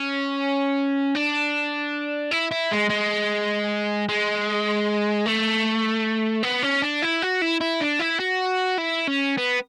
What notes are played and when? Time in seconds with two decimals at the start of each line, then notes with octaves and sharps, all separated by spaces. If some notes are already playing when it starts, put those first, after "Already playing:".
Already playing: C#4
1.15 D4
2.31 E4
2.51 E4
2.71 G#3
2.90 G#3
4.09 G#3
5.26 A3
6.43 B3
6.62 C#4
6.82 D4
7.02 E4
7.22 F#4
7.42 E4
7.61 E4
7.81 D4
8.00 E4
8.20 F#4
8.78 E4
9.08 C#4
9.37 B3